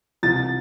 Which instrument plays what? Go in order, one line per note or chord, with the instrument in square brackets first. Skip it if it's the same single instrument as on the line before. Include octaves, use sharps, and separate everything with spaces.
[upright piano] C2 A6